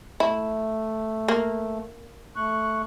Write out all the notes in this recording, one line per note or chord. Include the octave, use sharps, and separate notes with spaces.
A3 E4
A#3
A3 C#6 F#6